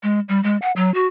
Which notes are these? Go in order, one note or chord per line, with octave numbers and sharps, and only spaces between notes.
G#3
G3
G#3
F#5
F#3
F#4